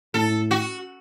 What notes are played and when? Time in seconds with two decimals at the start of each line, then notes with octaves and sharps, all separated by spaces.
0.14 A2 A4
0.51 F#4